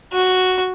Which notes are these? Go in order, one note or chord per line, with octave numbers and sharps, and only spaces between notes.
F#4